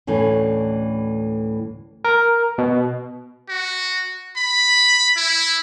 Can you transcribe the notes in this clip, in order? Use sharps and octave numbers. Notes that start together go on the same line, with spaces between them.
D2 A2 E3 C#4
A#4
B2
F#4
B5
E4